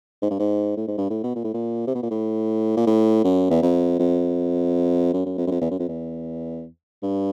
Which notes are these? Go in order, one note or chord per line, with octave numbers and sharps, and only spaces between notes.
G#2
G2
G#2
A2
G#2
G2
A2
B2
A#2
A2
A#2
C3
B2
A#2
A2
A#2
A2
F#2
E2
F2
F2
F#2
F#2
F2
F#2
F2
E2
F#2
F2
E2
G2